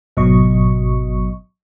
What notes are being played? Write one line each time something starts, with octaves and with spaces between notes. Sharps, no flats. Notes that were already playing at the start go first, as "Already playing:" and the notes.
G#1 B2 F#3 D#5 C#6